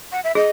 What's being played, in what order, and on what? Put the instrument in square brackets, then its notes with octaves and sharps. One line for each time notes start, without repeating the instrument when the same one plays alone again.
[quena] F#5
E5
[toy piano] G#4 [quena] D#5